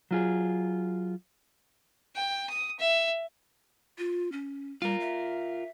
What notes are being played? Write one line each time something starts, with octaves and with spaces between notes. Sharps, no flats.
F#3 F4 G#4
G5
D#6
E5
F4
C#4
G3 F4 A#4
E5